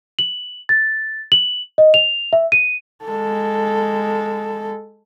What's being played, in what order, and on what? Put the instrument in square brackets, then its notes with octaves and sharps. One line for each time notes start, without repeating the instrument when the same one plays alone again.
[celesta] F#7
A6
F#7
D#5
F7
E5
D#7
[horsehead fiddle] G#3 A4